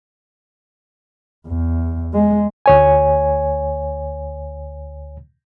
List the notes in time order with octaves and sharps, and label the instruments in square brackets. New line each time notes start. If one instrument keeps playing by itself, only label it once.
[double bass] E2
G#3
[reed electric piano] D2 C#5 G#5